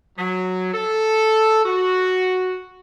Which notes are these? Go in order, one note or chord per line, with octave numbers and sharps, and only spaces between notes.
F#3
A4
F#4